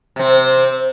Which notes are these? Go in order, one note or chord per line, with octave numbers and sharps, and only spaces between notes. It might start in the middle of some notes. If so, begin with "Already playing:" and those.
C3 C4